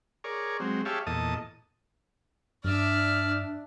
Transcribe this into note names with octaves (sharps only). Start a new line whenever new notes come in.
G#4 A#4 C#5 D5
F#3 G#3 C4
G4 G#4 C#5 E5 F5 A5
E2 A#2 A4 D#5 A5 D#6
G2 D4 D5 E5 F6